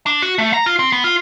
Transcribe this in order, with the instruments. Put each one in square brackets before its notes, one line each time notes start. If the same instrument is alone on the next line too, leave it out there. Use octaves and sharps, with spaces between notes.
[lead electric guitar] D4
F#4
A3
A#5
F4
C4
B3
F4